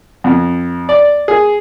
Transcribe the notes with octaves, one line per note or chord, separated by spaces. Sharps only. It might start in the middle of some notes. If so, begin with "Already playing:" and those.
F2
D5
G#4